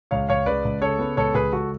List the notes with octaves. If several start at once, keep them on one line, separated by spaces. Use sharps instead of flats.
C#2 C#5 F5
C#2 C#5 F5
C#3 B4 D5
C#2
C#3 A4 C#5
B3
C#2 A4 C#5
C#2 G#4 B4
C#2 F#4 A4